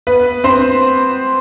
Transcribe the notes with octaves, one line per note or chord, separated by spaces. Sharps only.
B3 B4
C4 C5